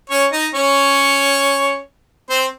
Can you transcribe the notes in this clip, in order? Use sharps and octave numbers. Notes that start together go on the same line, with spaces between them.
C#4 C#5
D#4 D#5
C#4 C#5
C4 C5